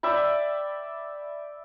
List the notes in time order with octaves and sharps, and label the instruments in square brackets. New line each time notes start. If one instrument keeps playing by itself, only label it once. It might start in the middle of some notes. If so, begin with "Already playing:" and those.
[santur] D5 E5 G5 B5